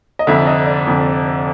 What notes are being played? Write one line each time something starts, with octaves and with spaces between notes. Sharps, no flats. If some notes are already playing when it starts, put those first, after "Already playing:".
D#5
F1 F2 D3 E5
D#5
D5
F1 F2 D3